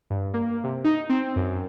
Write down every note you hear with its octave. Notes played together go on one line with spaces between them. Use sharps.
G2
A#3
C3
D#4
C4
F#2